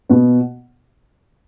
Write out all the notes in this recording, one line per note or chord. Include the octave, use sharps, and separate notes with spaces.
B2 B3